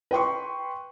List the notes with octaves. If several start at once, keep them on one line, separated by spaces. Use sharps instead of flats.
B4 G5 C6 C#6